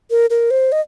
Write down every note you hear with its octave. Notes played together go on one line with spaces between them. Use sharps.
A#4
A#4
C5
D#5